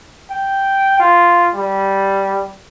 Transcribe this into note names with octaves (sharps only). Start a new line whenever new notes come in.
G5
F4
G3